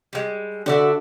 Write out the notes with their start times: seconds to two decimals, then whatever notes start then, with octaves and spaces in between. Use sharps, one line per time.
0.13 G3 G#3
0.66 D3 F#4 D5 E5